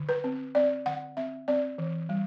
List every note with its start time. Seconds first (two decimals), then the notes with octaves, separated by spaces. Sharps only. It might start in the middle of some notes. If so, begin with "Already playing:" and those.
Already playing: D3
0.09 B4
0.24 C4
0.55 C4 D5
0.85 D3 F#5
1.17 C4 E5
1.48 C4 D5
1.78 E3
2.09 G3